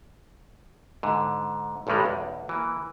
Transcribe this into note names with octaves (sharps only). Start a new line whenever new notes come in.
G#2 D3
A1 G2 D#3 G3 G#3
B1 E2
E3 A#3